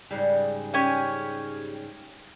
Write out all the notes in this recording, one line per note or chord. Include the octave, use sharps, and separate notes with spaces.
G#2 C#3 G3
C#4 G4 G#5